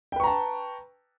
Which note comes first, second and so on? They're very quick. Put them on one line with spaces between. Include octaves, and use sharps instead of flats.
G5 B4 C#6 A#5 A5